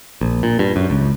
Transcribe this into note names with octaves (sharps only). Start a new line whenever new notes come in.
A#1
A#2
G2
F#2
C#2